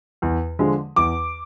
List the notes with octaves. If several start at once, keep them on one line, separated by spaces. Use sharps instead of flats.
E2
D3 F3 G#3
E2 D6